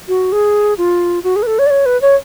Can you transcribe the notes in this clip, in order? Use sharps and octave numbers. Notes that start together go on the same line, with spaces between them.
F#4
G#4
F4
F#4
G#4
B4
A4
C#5
D5
C#5
B4
C#5